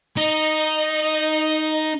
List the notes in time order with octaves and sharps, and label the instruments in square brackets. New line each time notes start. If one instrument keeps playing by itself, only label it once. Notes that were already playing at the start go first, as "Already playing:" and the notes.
[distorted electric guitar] D#4 [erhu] D#5